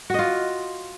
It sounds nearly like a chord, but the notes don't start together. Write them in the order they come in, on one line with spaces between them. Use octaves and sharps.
F#4 D#5 F4